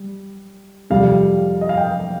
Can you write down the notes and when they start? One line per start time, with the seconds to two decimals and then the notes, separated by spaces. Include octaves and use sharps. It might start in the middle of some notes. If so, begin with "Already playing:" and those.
Already playing: G3
0.90 F2 C3 G3 F5
1.61 D#5
1.69 F5
1.77 G5